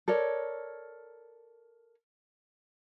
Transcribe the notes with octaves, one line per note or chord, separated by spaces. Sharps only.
A4 A#4 C#5 D5